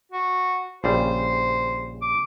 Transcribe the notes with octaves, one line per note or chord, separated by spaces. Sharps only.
F#4
A#1 C#3 G3 C5
D6